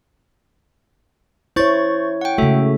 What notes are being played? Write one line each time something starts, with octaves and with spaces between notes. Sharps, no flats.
E4 C5 C#5 C#6 A6
F#5 G5
C#3 G#3 A3 F#4 A4 E5